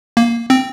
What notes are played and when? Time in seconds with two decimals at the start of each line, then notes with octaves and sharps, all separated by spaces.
0.17 A#3
0.50 C4